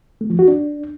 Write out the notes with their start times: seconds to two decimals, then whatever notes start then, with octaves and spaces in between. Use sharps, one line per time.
0.21 A3
0.30 F3
0.39 F#4
0.48 D4